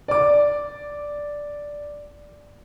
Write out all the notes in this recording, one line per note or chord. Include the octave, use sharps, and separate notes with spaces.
D5 D6